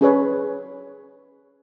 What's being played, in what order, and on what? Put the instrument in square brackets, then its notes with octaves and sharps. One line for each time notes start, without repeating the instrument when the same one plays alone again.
[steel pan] C#4 G#4 B4 C#5